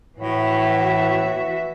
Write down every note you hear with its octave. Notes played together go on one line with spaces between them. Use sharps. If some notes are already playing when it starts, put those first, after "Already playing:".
A2 E3 F#4 E5